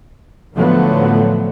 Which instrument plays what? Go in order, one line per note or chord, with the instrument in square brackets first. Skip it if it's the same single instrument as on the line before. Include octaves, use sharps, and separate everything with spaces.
[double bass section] A2 D3 F3 F#3 A3 B3